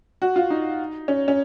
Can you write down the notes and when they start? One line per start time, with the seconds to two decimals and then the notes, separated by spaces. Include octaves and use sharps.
0.22 F#4
0.36 F4
0.50 D#4
1.08 C#4
1.28 C#4